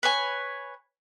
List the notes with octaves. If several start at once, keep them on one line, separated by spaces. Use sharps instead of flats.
B4 C#5 G#5